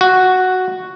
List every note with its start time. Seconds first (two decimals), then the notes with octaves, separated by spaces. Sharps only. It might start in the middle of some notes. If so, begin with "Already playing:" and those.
0.01 F#4